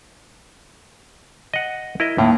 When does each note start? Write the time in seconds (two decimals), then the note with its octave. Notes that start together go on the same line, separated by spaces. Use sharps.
1.54 D#5 F#5
2.00 E4 A#4 D#5
2.18 D#2 A2